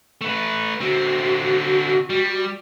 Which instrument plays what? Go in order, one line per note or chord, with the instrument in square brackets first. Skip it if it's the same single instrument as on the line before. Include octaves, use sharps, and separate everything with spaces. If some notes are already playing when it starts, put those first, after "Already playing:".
[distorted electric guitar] A3 B4
[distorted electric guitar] D3 C4 [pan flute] F#4
[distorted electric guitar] G3